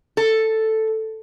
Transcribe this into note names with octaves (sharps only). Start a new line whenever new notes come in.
A4